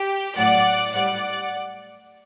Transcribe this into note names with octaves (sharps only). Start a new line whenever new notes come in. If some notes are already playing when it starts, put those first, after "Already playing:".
Already playing: G4
A2 F#3 D5 F#5
A2 G3 D5 F#5